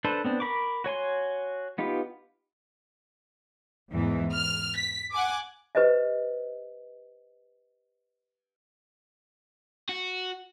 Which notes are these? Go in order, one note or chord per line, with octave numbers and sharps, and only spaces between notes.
D4 A4 B4 C5
B3 C4 D4
A#4 B5 C#6 D6
F#4 C#5 G#5 C6
B3 D#4 F4 G4 B4
E2 G#2 E3
F6
B6
F#5 G#5 D6
G4 B4 C5 D#5 E5
F#4